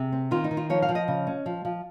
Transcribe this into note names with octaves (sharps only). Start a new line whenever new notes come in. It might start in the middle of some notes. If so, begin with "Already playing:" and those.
Already playing: C3 G#4
C4
D#3 F4
D#4
D#3
F4
F3 C#5
F5
F3
D#5
C#3
C#4
F3
F3